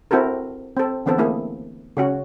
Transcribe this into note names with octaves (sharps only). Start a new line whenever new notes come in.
C4 E4 F#4 A4 A#4
C4 A4
D3 E3 B3 C4 A4
A3 A#3 E4 G#4
C#3 C#4 F#4